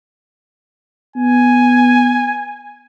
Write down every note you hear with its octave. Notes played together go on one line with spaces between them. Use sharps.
B3 G#5